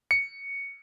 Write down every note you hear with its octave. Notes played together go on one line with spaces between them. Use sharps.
C#7